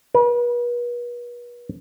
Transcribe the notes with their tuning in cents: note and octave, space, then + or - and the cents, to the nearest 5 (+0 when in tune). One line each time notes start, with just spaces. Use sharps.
B4 -40